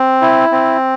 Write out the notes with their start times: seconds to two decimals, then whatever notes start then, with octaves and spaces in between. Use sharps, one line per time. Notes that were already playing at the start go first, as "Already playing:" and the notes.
Already playing: C4
0.22 E4
0.52 C4